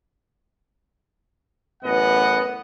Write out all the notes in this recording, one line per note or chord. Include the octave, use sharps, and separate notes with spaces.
A1 F#2 B3 D#5 F#5